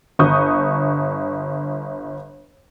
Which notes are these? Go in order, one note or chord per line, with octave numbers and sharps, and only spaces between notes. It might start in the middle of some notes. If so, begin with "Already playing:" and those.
G1 C#6 D#6 G6